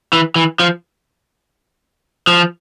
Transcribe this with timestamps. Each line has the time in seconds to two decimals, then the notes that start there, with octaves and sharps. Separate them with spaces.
0.13 E3
0.36 E3
0.60 F3
2.27 F3